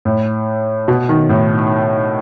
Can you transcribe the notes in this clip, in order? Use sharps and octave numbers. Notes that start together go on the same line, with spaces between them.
A2
B2
D#3
A2